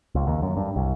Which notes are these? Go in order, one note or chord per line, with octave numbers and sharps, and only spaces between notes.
C#2
D#2
F#2
G2
C2